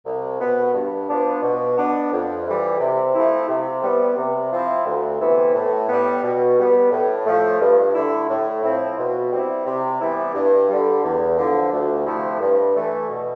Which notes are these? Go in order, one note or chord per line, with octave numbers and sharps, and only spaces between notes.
C2
B2 B3
G2
F3 B3 D4
B2
B3 D4
F2
E3 G3
C3
F3 A3 C4 E4
C3
G3 B3
C3
F3 C4 E4
D2
C3 E3 B3 E4
A2
G3 B3
B2
G3 B3
A2
F3 A3
G2
D3 A3 E4
A2
F3 C4 E4
B2
G3 C4 E4
C3
E3 G3 B3 E4
G2
D3 G3
E2
D3 F3
D2
C3 F3 A3 E4
G2
E3 A3
B2